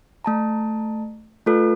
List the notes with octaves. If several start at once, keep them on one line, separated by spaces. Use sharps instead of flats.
A3 A5 A#5
A3 F4 A4 B4